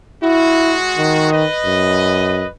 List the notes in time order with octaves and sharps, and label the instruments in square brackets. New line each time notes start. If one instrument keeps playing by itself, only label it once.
[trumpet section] G#3 F#4 [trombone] E4
[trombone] D#3
[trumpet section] B4 D#5
[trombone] F#2